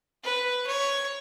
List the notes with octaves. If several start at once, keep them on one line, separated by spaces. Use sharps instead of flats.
B4
C#5